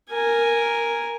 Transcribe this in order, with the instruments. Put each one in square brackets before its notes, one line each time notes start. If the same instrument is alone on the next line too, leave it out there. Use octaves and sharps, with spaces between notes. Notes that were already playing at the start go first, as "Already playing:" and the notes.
[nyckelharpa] A#4 G#5